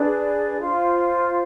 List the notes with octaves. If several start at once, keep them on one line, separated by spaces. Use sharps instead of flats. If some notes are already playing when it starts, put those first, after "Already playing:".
Already playing: D4 G#4 B4 D5
F4 C5 F5